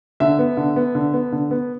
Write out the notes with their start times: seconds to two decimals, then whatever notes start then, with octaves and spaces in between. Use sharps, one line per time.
0.20 D3 E5
0.39 B3
0.57 D3
0.76 B3
0.95 D3
1.13 B3
1.32 D3
1.51 B3